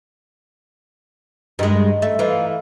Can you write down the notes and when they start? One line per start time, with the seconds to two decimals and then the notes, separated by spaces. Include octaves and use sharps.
1.59 G2 D#3 G#3
2.02 A3
2.19 E3 F3 D#4 F4